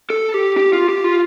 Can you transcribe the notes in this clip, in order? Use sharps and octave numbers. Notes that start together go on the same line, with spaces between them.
A4
G4
G4
F4
G4
F4